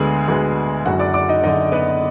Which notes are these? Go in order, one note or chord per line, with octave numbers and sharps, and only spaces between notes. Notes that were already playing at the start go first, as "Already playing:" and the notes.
Already playing: D2 D3 G#3 B3 G#4
D2 D3 G#3 B3
F#1 F#2 D3 F#4 F#5
D5 D6
D5 D6
D#4 D#5
F#1 F#2 D3 D#4 D#5
B3 B4